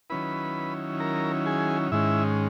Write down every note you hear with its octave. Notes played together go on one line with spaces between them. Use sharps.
D#3 F#3 C#4 E4 B4 B5
A#4 A#5
G#4 G#5
G#2 D#3 G#3 C#4 E4 E5